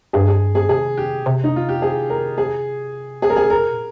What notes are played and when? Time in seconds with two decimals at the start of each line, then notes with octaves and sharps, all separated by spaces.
0.13 G2 G#4
0.28 G#4
0.55 G#4
0.69 C3 G#4
0.97 G4
1.26 C3
1.44 D#4
1.56 F4
1.69 G4
1.82 G#4
2.10 A#4
2.38 G#4
3.22 G#4
3.30 A#4
3.36 G#4
3.50 C#3 A#4
3.61 C3
3.71 A#2